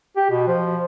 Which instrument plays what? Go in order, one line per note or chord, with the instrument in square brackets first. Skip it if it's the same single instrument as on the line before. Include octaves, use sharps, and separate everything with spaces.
[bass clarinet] G4
B2
F3